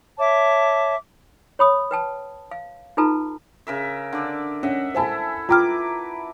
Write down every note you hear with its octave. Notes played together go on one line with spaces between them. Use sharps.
C#5 E5 A5 D6
C#5 B5 D#6
B4 G5 A5
F5
D#4 F4 A4 B4 A5 A#5
C#3 A#4 E5
D3 D5
C#4 D#5 E5 F#5
E4 A4 C5 E5 G#5 A5
F4 B4 G5 A#5 D6 F6